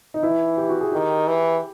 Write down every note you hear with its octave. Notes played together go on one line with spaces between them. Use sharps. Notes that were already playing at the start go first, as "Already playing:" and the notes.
D#4
E3 E4
G4
F#4
G#4
D#3 G4
E3